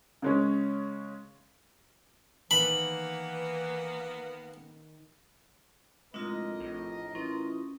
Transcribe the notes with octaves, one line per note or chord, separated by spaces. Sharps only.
C#3 G#3 C#4
D#3 E3 A#3 B3 B5
F1 A2 G#3 D4 F4 A#4 D#5
A#1
E3 C#4 F4